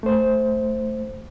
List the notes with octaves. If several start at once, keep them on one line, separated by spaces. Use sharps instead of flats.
A3 C5